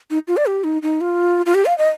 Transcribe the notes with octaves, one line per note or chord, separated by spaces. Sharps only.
D#4
F4
D5
G4
D#4
D#4
F4
F4
G4
F5
D#5